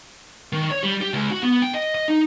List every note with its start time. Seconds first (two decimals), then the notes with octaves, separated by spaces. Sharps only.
0.53 D#3
0.71 C#5
0.83 G3
1.02 G4
1.13 C#2
1.31 F#4
1.43 B3
1.62 G5
1.74 D#5
1.95 D#5
2.08 D#4